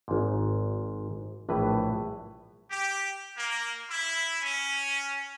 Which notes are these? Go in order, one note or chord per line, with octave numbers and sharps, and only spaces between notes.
G#1 G#2
A#1 A2 E3 B4
G4
A#3
E4
C#4